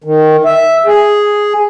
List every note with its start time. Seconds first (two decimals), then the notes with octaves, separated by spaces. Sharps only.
0.04 D#3
0.45 E5
0.86 G#4